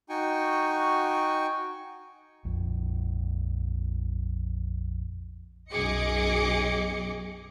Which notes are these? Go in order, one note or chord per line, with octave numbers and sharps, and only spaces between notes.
D#4 F#4 G5 G#5 C#6
A#1 F2
B1 F#2 G#4 D#5 D6 C#7